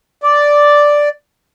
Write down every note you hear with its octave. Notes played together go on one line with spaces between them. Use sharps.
D5